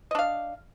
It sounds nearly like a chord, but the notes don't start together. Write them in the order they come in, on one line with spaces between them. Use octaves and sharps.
D#5 D4 F5